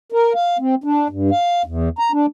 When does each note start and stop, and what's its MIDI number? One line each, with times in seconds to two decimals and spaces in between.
0.12 0.33 70
0.34 0.57 77
0.59 0.75 60
0.84 1.08 62
1.09 1.30 43
1.31 1.62 77
1.65 1.89 40
1.99 2.12 82
2.12 2.26 62